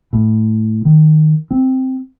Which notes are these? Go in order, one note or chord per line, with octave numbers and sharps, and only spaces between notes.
A2
D#3
C4